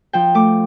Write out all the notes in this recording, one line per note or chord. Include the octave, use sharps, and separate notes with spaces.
F3 G5
A3 D6